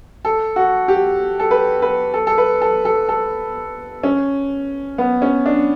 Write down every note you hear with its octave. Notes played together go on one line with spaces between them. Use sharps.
A4
F#4
G4
A4
B4
B4
A4
A4
B4
A4
A4
A4
C#4
B3
C#4
D4